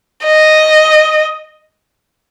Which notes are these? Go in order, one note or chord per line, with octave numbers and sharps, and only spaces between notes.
D#5